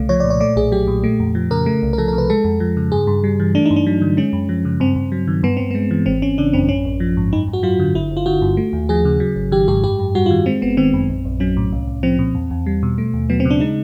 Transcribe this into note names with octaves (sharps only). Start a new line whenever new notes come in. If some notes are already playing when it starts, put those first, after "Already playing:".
Already playing: C2 C#3 A3
F3 C#5
A#2 D5
C#5
A3 D5
B1 G#4
F#3 G4
A#2
A3
F2
F3
C#3 A#4
A3
C2
A#4
F3 A4
A#4
C3
B4
G#3 A4
F2
F3
C#3
G2 G#4
G2
G3
E3
A3 D4
G2 D#4
D4
F#3
D3
G#3 C#4
F#2
F3
C#3
G2 C4
G2
F#3
D#3
G2 B3
G2 C4
G#3 B3
E3
G#1 C4
G#1 C#4
C#3 D4
F#2 C4
A1 C#4
A1
F3
G#2
F#2 D#4
F#2
F#4
F#3 F4
D3
G1 E4
G1
F4
D3 F#4
G2
A3
D#2
F3 G#4
C#3
F#3
G#1
D#3 G4
G#2 G4
F#2 G4
F#2
G3 F#4
F4
D#3
G#3 C4
G1 B3
D#3 C4
F#2
A#1
A#1
F#3 C#4
A2
C2
C2
F3 C4
A#2
E2
E2
G3
B2
A3
D#2
F#3 B3
C4
C#3
D4
G#3 D#4